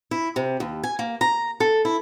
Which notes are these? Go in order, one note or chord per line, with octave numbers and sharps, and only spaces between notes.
E4
C3
D#2
G#5
A#3
A#5
A4
E4